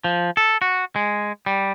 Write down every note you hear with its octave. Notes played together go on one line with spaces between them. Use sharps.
F3
A4
F#4
G#3
G3